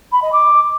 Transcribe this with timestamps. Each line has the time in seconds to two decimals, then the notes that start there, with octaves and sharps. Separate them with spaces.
0.12 B5
0.22 D#5
0.32 D6